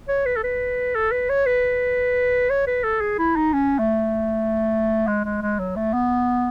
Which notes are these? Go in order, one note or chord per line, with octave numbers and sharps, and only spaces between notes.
C#5
B4
A4
B4
A4
B4
C#5
B4
C#5
B4
A4
G#4
E4
D#4
C#4
A3
G#3
G#3
G#3
F#3
A3
B3